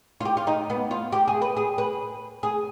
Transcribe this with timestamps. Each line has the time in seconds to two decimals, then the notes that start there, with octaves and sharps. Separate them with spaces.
0.20 F4
0.25 G4
0.37 F4
0.47 D#4
0.70 B3
0.91 F4
1.12 G4
1.28 G#4
1.42 B4
1.56 G#4
1.78 B4
2.43 G#4